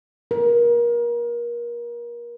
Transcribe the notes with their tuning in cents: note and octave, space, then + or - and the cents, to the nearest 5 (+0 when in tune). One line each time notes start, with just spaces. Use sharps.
A#4 +30